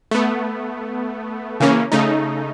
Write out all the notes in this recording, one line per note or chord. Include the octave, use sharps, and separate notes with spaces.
A3 B3
C#3 E3 A#3 C#4
C#3 A3 D#4